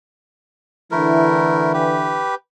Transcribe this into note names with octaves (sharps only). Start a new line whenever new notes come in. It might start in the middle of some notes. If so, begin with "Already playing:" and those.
D3 E3 A3 E4 A#4
G4 B4